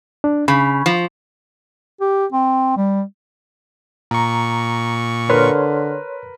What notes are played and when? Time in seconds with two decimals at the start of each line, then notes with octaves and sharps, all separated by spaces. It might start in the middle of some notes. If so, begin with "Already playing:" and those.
0.24 D4
0.48 C#3 B5
0.86 F3
2.01 G4
2.32 C4
2.77 G3
4.11 A#2 A#5 C#6
5.30 D3 A#4 B4 C#5 C6 F6